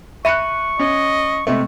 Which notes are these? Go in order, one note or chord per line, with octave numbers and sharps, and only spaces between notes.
E5 B5 C#6 F#6 C#7 D#7
C#4 D#5
C3 G#3 A3